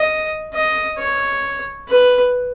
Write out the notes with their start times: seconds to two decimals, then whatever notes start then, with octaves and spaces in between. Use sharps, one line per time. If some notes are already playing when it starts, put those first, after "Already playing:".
Already playing: D#5
0.54 D#5
0.98 C#5
1.88 B4